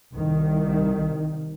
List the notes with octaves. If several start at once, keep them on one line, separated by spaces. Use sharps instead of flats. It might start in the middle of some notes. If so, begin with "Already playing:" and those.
C2 D#3